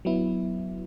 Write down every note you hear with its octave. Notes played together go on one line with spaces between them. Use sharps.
F#3 B3 E4